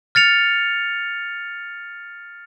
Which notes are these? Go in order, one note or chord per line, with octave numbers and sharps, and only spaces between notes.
F6 A6 C#7 F7